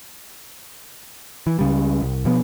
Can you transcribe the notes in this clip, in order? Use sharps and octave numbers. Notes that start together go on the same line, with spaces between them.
E3
C#2 C#3 G3
C2
B2 F3 B3